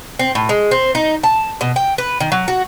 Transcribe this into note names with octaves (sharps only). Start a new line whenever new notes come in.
C4
A2
G#3
C4
D#4
A5
B2
G5
B4
D#3
F#3
F#4